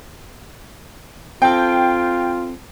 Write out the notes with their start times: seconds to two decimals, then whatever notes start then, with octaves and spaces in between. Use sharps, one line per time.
1.42 C4 F4 A4 G5